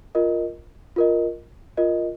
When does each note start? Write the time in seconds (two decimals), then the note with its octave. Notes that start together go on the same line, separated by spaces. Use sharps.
0.15 F4 A#4 D#5
0.96 F4 A#4 D#5
1.77 F4 A#4 D#5